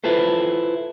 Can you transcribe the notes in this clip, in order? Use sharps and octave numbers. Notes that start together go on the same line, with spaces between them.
E4 F4 A4 B4 C5